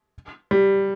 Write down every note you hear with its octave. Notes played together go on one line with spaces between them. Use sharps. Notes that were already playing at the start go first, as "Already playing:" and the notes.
G3